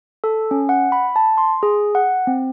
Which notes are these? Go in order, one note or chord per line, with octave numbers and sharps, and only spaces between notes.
A4
C#4
F#5
B5
A5
C6
G#4
F#5
C4